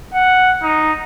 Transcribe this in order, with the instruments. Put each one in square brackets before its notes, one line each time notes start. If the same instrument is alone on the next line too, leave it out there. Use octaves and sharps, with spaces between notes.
[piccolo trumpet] F#5
D#4